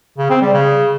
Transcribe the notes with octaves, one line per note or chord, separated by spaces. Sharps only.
C#3
C4
G3
C#3